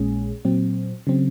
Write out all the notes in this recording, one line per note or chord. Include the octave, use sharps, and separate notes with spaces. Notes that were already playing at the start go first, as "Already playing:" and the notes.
Already playing: A#1 A#2 G#3 C#4 G#4
A#2 F#3 C4
C#3 F#3 C4